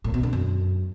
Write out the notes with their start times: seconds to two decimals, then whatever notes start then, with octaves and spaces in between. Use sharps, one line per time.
0.04 A2
0.14 B2
0.23 D3
0.33 F#2